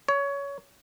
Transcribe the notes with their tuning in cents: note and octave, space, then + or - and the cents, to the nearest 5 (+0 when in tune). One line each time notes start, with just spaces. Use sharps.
C#5 +20